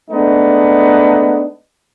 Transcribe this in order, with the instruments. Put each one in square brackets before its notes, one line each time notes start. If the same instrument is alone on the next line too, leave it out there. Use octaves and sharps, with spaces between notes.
[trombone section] G#3 A3 B3 D4 D#4